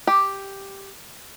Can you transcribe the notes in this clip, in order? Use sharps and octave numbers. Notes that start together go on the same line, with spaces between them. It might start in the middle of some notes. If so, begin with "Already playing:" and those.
G4